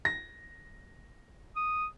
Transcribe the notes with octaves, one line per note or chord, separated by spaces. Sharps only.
A#6
D#6